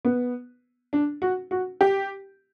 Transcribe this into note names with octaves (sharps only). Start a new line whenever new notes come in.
B3
D4
F#4
F#4
G4